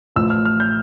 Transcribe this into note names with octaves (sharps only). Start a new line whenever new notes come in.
A1 A2 F3 E6
F6
F6
G6